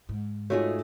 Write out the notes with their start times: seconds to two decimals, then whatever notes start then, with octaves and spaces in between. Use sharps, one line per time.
0.09 G#2
0.50 A3 D#4 F4 F#4 G#4 C#5